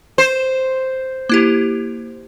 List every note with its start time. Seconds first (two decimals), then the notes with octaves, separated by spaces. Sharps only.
0.18 C5 E7
1.29 A#3 E4 G4